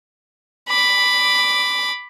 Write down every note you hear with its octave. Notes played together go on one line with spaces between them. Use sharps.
B5 D6